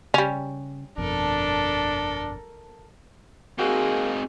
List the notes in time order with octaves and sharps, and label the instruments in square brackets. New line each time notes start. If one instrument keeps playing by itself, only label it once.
[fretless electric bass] C#3 [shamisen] G3 C#4
[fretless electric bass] G1 F2 B2 [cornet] D4 [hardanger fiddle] A4 A#4
[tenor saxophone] A#3 [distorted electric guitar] C4 D#4 [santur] F#4 [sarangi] G#4